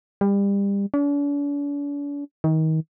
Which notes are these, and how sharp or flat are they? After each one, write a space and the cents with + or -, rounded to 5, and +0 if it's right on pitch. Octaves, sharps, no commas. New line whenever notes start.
G3 +30
D4 -45
D#3 +30